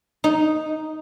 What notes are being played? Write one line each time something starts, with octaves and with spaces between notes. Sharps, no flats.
D#4